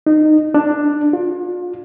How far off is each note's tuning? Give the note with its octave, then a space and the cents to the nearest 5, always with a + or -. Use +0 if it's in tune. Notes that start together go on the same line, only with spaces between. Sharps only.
D#4 -20
D4 +10
F4 +35